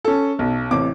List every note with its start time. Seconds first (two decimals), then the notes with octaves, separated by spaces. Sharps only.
0.05 C#4 A4
0.39 B1
0.71 A1 C3 D6